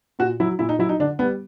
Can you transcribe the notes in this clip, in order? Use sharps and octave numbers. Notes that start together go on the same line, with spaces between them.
A#2 F#4
F#3 E4
A#2 E4
D#4
F#3 E4
D#4
D3 D4
G3 B3